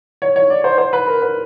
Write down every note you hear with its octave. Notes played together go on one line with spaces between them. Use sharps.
C#5
C#5
D5
C5
C5
B4
A#4
B4